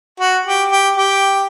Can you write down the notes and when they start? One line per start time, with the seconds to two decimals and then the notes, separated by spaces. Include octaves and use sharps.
0.20 F#4
0.46 G4
0.71 G4
0.96 G4